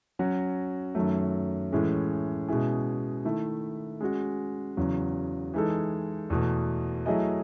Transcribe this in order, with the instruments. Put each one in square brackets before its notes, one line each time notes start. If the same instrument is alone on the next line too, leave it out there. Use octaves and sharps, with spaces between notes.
[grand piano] F#3 C#4 F#4
F#2 D#3 F#3 A3
A2 E3 G#3 C#4
B2 G#3 C#4 E4 G#4
D#3 A3 E4
G#3 C#4 F#4
E2 C#3 F#3
E3 G#3 D#4 A4
E2 B2 A3
F#3 A3 E4 G#4 D#5